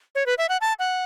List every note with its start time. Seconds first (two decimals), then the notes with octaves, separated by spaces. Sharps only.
0.15 C#5
0.26 B4
0.38 E5
0.49 F#5
0.61 A5
0.79 F#5